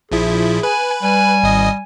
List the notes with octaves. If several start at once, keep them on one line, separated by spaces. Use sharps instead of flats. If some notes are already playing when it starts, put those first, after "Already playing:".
A#1 F3 E4 G#4
B4 G#5
G3 G#5
G#1 D#5